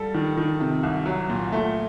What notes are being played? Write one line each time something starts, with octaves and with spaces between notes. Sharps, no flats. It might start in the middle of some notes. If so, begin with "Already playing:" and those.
Already playing: G3 A4
D#3
D#3
C3
C2
F#3
A#2
A3